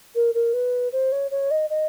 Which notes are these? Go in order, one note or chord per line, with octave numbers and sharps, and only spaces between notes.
A#4
A#4
B4
C5
C#5
C#5
D#5
D#5